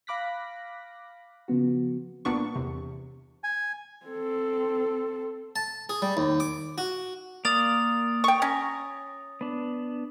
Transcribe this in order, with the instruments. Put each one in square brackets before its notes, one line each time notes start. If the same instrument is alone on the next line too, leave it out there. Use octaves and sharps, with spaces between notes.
[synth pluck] F5 B5 D6 F#6 A#6 B6
C#3 F3 B3 F#4
[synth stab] C2 A#2 B3 D4 C#6
E2 C3
[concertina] G#5
[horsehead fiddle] C4 A4
[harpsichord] A5
G#4
G3
D#2
D6
F#4
[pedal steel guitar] A#3 D5 F5 [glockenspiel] D#6 A6 F7
[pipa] G5 C#6
[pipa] C#4 [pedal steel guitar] A#5
[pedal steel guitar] B3 D4